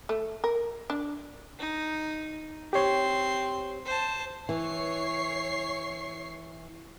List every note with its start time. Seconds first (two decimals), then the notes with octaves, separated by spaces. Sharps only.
0.09 A3
0.44 A#4
0.90 D4
1.59 D#4
2.73 C4 G4 C#5 C6
3.85 C5 A5
4.49 E3 C#5 C#6 C7